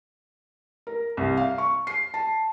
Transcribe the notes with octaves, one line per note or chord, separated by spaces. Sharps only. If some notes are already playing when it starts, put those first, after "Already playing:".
A#4
C2
F5
C#6
C7
A5